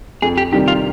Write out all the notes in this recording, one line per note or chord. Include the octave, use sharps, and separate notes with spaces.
F2 G#4
G4
C3 D#3 G3 G4
F4